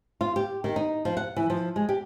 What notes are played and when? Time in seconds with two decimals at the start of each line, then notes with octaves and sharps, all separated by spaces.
0.21 F4
0.36 G4
0.64 D#3
0.76 D#4
1.05 F3
1.17 F#5
1.36 E3
1.50 F3
1.76 G#3
1.89 G4